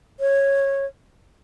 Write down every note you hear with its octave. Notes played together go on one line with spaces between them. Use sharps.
C#5